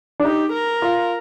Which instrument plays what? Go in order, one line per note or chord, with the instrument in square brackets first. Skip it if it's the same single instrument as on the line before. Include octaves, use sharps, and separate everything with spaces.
[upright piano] D4
[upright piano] D#4 [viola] G4
[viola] A#4
[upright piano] F4